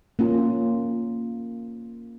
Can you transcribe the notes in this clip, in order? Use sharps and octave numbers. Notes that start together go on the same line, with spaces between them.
A#3 C#4 F4